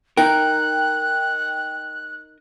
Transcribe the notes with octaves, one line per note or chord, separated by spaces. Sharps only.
D#4 A#4 G5 F#6